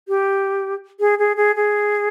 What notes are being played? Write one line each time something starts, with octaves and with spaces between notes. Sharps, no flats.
G4
G#4
G#4
G#4
G#4